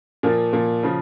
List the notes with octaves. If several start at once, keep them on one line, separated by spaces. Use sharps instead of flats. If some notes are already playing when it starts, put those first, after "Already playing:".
A#2 F3 A#3
A#2 F3 A#3
C#3 F3